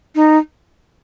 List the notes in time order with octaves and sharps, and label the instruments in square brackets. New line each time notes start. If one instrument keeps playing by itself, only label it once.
[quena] D#4